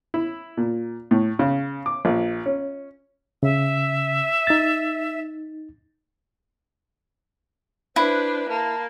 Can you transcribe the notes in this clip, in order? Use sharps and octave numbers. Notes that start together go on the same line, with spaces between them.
E4
A#2
A2
C#3
D6
A#1
C#4
C#3 E5
D#4 A6
D4 E4 B4 C5
A#3 A5